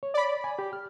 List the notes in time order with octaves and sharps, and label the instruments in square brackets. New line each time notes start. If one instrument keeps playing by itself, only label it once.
[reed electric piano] C#5
[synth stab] D5 B5
[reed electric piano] G#5
G4
F6